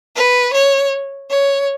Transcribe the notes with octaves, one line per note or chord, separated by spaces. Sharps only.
B4
C#5
C#5